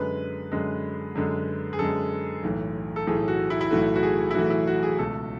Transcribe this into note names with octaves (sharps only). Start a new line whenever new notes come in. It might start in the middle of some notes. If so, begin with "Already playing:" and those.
Already playing: F#2 D3 G#3 B4
F#2 D3 G#3
F#2 D3 G#3
G#4
F#2 D3 G#3 A4
B1 A2 E3 A3
A4
B1 A2 E3 A3 G#4
F#4
E4
E4
B1 A2 E3 A3 F#4
F#4
G#4
E4
B1 A2 E3 A3 F#4
E4
F#4
G#4
C#2 B2 A3 A4